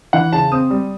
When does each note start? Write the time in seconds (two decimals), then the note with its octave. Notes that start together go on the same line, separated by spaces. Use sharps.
0.13 E3 F#5
0.33 C#3 A5
0.52 C4 D#6
0.70 G3